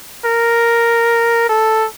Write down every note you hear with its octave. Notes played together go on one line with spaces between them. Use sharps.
A#4
A4